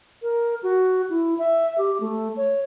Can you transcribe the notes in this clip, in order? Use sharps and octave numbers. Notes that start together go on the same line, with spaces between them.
A#4
F#4
E4
E5
G4
A3
C#5